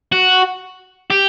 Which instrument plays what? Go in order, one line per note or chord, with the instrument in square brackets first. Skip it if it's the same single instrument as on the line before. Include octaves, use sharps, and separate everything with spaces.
[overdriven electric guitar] F#4
G4